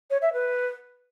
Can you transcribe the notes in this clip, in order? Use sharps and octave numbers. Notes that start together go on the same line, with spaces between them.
C#5
E5
B4